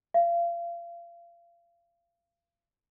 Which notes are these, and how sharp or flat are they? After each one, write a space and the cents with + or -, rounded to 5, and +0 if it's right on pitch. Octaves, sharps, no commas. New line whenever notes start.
F5 -30